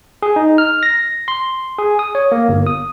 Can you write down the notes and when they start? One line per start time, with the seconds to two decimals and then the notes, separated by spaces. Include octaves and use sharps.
0.23 G#4
0.36 D#4
0.58 F6
0.83 A#6
1.28 C6
1.79 G#4
1.99 D#6
2.15 C#5
2.32 A#3
2.49 G1
2.66 D#6